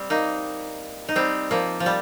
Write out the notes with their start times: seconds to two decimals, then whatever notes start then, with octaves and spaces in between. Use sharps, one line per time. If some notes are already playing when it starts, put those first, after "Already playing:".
Already playing: G3 C4
0.10 A#3 D#4
1.09 D#4
1.16 G3 C4
1.51 F3 A#3
1.80 F3
1.86 G3